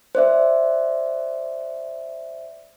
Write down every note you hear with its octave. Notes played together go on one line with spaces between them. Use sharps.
C5 D5 E5